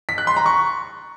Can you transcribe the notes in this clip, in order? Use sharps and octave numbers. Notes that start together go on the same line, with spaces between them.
B6
F#6
C6
A#5
C#6